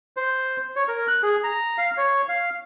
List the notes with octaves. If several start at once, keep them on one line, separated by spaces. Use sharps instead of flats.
C5
C#5
A#4
F#6
G#4
A#5
F5
C#5
F5